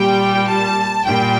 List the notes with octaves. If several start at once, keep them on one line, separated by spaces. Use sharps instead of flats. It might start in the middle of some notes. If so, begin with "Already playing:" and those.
Already playing: A#2 G3 G5
A5
A#2 G3 G5